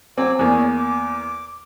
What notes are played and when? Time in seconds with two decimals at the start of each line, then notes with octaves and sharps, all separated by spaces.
0.18 F#3 C4 G#5 D6
0.39 E2 A#3 C#4 G#4 D5
0.77 D6